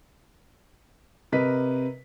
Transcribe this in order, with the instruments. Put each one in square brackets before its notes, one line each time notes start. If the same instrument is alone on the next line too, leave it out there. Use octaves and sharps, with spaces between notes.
[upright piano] C3 A#4 B4 D#5 B6